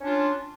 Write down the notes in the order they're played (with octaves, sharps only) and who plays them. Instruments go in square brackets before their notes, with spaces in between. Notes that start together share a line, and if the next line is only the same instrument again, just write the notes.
[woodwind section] C#4
D4
F4